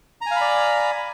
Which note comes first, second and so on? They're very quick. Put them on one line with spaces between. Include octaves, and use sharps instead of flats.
A#5 G#5 F5 B5 D5